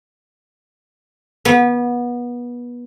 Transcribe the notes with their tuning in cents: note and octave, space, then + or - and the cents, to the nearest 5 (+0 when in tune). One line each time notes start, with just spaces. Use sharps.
B3 -25